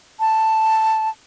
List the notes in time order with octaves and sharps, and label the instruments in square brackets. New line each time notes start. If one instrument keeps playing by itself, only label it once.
[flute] A5